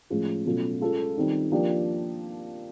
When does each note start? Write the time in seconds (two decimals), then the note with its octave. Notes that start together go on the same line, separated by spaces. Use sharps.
0.10 A2 F3 G#3 C#4
0.46 B2 F#3 A3 C#4 F4
0.81 G#3 C#4 F4 A4
1.17 D#3 G3 C4 D#4
1.52 F3 A#3 D4 G4